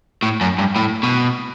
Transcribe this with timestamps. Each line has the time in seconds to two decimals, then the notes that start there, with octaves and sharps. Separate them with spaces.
0.23 A2
0.41 F#2
0.58 G2
0.76 A2
1.03 B2